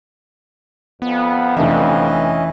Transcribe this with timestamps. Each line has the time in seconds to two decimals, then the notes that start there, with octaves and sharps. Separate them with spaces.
1.02 F2 B3
1.57 F1 E3 C#4 D4 D#5 E5